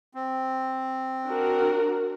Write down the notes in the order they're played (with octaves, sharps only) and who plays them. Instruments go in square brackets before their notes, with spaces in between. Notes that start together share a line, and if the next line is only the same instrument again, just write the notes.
[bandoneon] C4
[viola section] D4 F#4 A#4